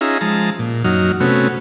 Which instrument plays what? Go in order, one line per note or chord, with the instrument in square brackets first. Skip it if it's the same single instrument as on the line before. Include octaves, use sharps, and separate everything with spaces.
[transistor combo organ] C#4 D#4 F4 G#4 E5 A#5
F3 G#3 A5 A#5
A#2
F#2 F#3 D#4 F6
C3 A3 B3 C#4 F#4